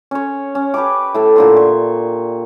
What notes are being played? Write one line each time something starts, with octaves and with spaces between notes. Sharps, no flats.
C#4 C#5
C#4
G4 B4 A5 D6
A2 A4
A#2 D3 C6
C#6